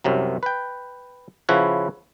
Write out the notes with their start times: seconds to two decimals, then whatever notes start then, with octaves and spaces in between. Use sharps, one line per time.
0.04 C2 F#2 C3 F#3
0.43 B4 G5
1.49 C#3 F3 E4 B4 C#5 F#5